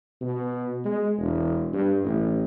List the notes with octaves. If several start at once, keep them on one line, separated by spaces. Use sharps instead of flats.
B2
G#3
E1
G2
A1